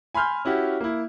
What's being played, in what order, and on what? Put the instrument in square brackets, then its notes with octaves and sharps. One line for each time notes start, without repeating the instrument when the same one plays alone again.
[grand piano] G#5 B5 C6 F6 G6
C#4 E4 F#4 G4
A#3 E4